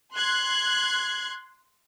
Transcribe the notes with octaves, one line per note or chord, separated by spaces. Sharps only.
C6 F#6 G#6